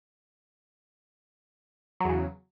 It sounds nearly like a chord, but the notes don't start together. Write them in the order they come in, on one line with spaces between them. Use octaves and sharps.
F#3 E2 C#3